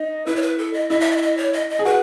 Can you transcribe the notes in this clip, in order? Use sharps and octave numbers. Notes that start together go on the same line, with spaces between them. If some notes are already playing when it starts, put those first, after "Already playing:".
Already playing: D#4 D#5
E4 B4
C#5
B4
A4
D#5
E4 D#5
E5
D#5
E5
D#5
C#5
D#5
D#5
G#4
F#4 B4